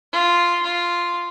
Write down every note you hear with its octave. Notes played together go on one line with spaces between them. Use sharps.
F4
F4